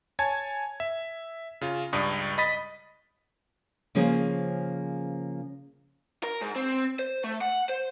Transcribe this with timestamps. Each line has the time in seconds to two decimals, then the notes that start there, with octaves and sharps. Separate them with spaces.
0.19 C#5 G#5 A5 G#6
0.80 E5
1.61 C#3 F4
1.93 C#2 G2 D5 C#6 D#6
2.38 D#5 B5 D#6 A6 B6
3.95 C#3 F3 A#3 C#4 G#4 C5
6.24 A#4
6.41 G#2
6.56 C4
6.99 C5
7.24 A3
7.41 F#5
7.69 C5